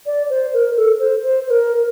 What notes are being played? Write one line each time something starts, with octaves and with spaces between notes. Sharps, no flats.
D5
C5
A#4
A4
C5
C5
C5
A#4